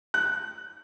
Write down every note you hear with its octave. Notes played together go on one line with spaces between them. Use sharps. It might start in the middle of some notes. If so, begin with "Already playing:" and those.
F#6